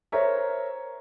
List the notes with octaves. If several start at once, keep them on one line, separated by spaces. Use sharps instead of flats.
A#4 C5 C#5 E5 A#5